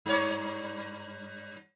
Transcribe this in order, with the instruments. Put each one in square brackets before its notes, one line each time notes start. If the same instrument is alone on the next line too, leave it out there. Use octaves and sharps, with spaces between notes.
[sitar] G2 C#5